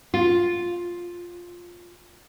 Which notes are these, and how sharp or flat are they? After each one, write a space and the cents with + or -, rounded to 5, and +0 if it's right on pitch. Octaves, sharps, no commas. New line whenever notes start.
F4 +5